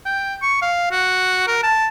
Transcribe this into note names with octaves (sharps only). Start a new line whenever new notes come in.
G5
C#6
F5
F#4
A#4
A5